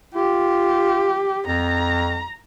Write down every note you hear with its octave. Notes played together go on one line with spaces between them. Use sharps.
F4 G4
F2 A#5